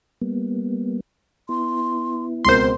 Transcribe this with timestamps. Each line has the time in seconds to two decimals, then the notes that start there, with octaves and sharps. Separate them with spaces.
0.22 G3 A#3 B3
1.49 B3 E4 C6
2.45 C#2 B2 C4 A#4 C5 C6